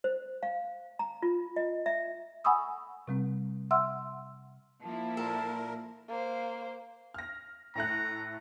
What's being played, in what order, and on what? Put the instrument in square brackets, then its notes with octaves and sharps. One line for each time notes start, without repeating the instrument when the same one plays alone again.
[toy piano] C5
F5
A#5
F4
D#5
E5
[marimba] F#5 G#5 B5 C#6 D#6 E6
C3 G3 C4
E5 F#5 C6 E6 F6
[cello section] F3 A#3 E4 [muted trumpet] A5
[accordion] A#2 A#4 [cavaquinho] A4
[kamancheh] A#3 C5
[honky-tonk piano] F6 A#6
[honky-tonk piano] A2 A3 F#6 [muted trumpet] A#5